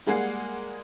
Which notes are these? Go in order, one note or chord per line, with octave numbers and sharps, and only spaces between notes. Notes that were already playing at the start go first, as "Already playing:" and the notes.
G3 G#3 A#3 G#4 F#5 C7